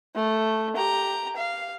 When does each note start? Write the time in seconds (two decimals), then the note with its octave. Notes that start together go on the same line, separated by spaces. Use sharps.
0.15 A3
0.76 G4 A#5
1.37 F5